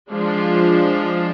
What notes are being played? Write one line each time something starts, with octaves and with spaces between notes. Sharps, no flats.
F3 G#3 D4 F4